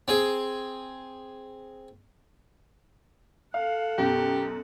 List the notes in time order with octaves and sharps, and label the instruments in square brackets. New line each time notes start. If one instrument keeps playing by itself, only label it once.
[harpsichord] C4 G#4
[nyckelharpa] A4 F#5 [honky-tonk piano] F5
[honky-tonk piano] F#2 B2 [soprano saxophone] G4